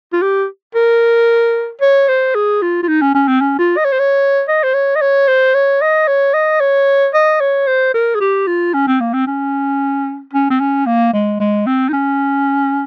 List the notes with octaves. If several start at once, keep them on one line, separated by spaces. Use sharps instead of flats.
F4
G4
A#4
C#5
C5
G#4
F4
F4
D#4
C#4
C#4
C4
C#4
F4
D#5
C#5
C5
C#5
D#5
C5
C#5
D#5
C#5
C5
C#5
D#5
C#5
D#5
C#5
D#5
C#5
C5
A#4
G#4
G4
F4
C#4
C4
A#3
C4
C#4
C#4
C4
C#4
A#3
G#3
G#3
C4
D#4
C#4